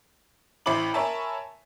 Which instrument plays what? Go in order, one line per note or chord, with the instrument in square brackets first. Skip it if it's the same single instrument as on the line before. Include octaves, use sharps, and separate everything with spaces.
[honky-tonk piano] A1 E4 C5 B5 D6 F#7
A#4 C#5 E5 G#5 A5 B5